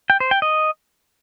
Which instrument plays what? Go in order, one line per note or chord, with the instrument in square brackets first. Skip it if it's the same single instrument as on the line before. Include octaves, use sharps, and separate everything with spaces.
[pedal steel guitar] G5
C5
G5
D#5